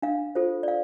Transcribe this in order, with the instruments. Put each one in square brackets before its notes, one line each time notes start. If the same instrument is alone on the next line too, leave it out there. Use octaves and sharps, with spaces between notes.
[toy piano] D4 F5
F4 A4 C5
D5
F5